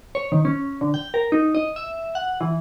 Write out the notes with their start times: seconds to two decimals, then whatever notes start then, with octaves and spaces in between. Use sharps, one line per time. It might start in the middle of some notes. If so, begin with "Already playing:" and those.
0.15 C#5
0.32 D#3
0.45 C#4
0.81 D3
0.94 G5
1.14 A#4
1.32 D#4
1.55 D#5
1.76 E5
2.15 F#5
2.41 E3